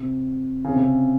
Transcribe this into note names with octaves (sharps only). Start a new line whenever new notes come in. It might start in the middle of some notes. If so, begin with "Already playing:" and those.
Already playing: C3
C#3
C3
C#3